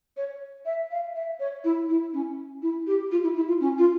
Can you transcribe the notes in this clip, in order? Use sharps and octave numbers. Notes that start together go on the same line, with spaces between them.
C#5
E5
F5
E5
C#5
E4
E4
C#4
E4
G4
F4
E4
E4
F4
C#4
F4